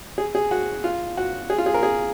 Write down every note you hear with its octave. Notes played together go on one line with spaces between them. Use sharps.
G#4
G#4
F#4
F4
F#4
G#4
F4
G#4
A#4
G#4